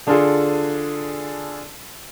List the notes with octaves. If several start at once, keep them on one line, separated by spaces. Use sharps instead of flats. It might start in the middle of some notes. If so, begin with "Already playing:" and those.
D3 D4 F4 G#4 A4